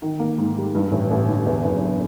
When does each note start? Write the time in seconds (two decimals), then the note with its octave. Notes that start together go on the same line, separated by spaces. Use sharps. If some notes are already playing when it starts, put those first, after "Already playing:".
0.02 D#3
0.19 A#3
0.38 G#2
0.56 G3
0.75 G2
0.92 A1
1.11 A1
1.29 D3
1.46 E2
1.65 F#1